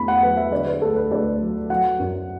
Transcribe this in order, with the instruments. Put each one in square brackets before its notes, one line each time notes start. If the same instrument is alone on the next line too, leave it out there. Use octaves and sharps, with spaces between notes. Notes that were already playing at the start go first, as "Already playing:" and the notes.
Already playing: [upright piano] E2 D3 A3 B5
F#5
F#3 B4
E5
D3 D5
B4
D2 A4
B4
D2 D5
F#3
F#3 F#5
F#2